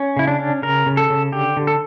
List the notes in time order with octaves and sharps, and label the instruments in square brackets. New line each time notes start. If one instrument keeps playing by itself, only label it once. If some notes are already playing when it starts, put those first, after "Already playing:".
Already playing: [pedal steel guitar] C#4
C#3 E4
D4
C#4
C#3 A#4
C#3
A4
C#3
D3 G4
D3
A4